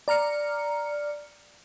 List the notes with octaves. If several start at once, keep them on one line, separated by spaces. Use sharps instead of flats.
D5 A#5 F6 C#7